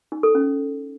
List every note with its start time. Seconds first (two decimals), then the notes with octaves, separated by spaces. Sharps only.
0.12 D#4
0.23 A4
0.35 C#4